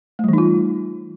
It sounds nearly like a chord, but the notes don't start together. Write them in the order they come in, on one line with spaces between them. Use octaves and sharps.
A3 G3 E3 D#4 F4